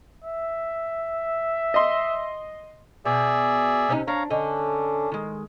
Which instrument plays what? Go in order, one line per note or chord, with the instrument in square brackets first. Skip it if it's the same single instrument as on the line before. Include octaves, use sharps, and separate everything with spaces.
[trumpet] E5
[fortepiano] D#5 C6
[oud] B2 [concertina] G#4 D5 E5
[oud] C3 C#4 D#4
[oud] D4 [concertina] C#5 F5 A#5
[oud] D3 D#5 [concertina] C#4 D4
[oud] D#3 G#3